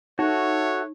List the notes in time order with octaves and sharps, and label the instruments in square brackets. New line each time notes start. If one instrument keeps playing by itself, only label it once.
[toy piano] D#4 [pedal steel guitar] F#4 [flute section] A4 E5 F#6 [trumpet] C#5